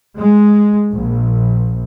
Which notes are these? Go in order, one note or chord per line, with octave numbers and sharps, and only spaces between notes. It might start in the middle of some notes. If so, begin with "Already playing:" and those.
G#3
A#1